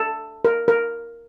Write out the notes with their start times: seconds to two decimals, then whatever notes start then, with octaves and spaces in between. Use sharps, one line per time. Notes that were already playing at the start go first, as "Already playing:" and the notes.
Already playing: A4
0.45 A#4
0.68 A#4